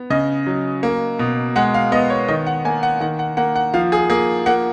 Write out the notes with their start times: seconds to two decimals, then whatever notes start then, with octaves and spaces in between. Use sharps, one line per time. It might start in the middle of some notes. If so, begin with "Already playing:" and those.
Already playing: B3
0.10 C#3 D#5
0.47 F#3
0.83 A#3
1.19 B2
1.56 G#3 F#5
1.74 F5
1.92 B3 D#5
2.10 C#5
2.28 D#3 D#5
2.46 F#5
2.65 A#3 G#5
2.83 F#5
3.00 D#3 F#5
3.19 F#5
3.37 A#3 F#5
3.56 F#5
3.74 F3 F5
3.92 G#4
4.10 A#3 G#4
4.46 A#3 F#5